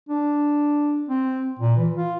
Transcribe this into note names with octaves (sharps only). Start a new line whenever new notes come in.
D4
C4
A#2
E3
F4